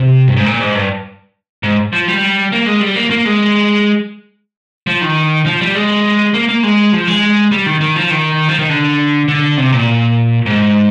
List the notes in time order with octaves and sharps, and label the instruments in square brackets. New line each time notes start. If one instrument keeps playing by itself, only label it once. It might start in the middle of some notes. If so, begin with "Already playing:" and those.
Already playing: [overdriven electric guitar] C3
G2
G#2
A#2
G#2
G2
G#2
F3
G3
A#3
G#3
G3
A#3
A#3
G#3
F3
D#3
F3
G3
G#3
A#3
A#3
G#3
F3
G#3
G3
D#3
D#3
F3
D#3
F3
D#3
D3
D3
C3
A#2
G#2